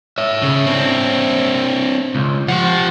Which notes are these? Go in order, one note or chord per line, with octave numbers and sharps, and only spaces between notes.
C#5 E5
C#3
C4 D4
C#2
F3 G4 F#5